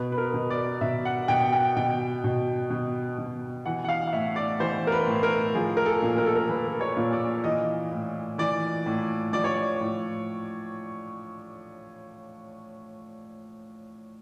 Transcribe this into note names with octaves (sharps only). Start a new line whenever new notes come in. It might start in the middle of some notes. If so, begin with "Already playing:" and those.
Already playing: B2 B4
B4
A#4
B2
D5
B2 E5
F#5
B2 G5
G5
B2 G5
B2
B2
B2
E3 F#5
F#5
F5
F5
A2 E5
D5
E3 C5
A#4
B4
A2
A#4
F3 G#4
A#4
A4
A#2
A#4
A4
A#4
F3 B4
C#5
A#2
D5
E3 D#5
A2
E3 D5
A2
F3 D5
C#5
D5
A2